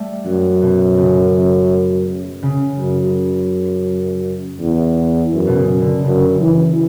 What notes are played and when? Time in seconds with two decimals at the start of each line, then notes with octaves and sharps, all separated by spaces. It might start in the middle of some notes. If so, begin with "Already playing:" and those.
Already playing: G3 A3
0.25 F#2 F#3
0.62 B2
0.98 C#3
2.43 C#3
2.79 F#2
4.60 E2
5.33 F#2
5.47 B2
5.56 C#3
5.80 D3
6.04 F#2 C#3
6.41 E3